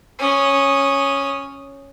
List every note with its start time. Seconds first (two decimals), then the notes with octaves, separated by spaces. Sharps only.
0.19 C#4 D#6